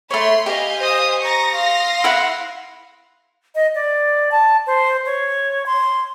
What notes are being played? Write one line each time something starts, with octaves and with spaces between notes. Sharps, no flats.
A3 C#5 B5 C6
G4 D#5 F5 G#5
C5 D#6
A#5 C#6 D#6 A#6
F5 C6
E4 E5 F#5
D#5
D5
A5
C5
C#5
C6